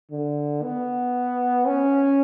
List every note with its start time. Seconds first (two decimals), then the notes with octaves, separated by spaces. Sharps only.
0.11 D3
0.63 B3
1.67 C#4